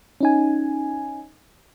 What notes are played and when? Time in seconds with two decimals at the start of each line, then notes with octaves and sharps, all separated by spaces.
0.21 C#4 D#4 G#5